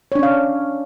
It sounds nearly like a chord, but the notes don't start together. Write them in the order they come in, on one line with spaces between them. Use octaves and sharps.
C#5 D4 C#4 F5